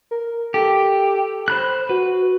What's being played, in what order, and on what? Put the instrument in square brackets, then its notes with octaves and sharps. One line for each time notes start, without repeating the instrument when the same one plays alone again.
[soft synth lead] A#4
[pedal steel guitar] G4 [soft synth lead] A4
[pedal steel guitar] C5 B5 F#6
[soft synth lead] F#4 [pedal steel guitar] B4